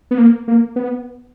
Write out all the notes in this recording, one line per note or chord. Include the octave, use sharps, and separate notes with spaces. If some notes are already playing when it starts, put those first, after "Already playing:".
B3
A#3
A#3
B3